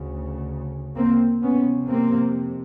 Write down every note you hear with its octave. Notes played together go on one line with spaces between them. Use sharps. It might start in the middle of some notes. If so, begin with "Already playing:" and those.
Already playing: D2 C#3
A#3 C4
F2 C3 B3 C#4
A#3 C4